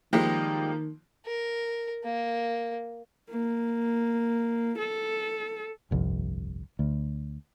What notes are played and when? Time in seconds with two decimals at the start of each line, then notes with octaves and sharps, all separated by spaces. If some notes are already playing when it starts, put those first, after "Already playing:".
0.13 D#3 F3 G3 G#3 A#3 G4
1.26 A#4
2.04 A#3
3.30 A#3
4.78 A4
5.91 G1 C2 F2
6.79 D2